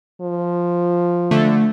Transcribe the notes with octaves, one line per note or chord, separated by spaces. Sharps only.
F3
D3 A3